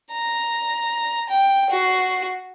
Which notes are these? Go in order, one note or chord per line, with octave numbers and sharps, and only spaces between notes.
A#5
G5
F#4 C7